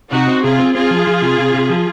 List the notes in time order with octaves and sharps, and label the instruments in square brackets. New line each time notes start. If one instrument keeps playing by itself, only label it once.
[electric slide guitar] C3 [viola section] D#4 F#4
[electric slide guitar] C4
[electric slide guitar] C3 [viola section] F4 G#4
[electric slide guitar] C4
[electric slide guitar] C4 [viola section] F4 G#4
[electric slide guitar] F3
F3
C3
C3
C3
F3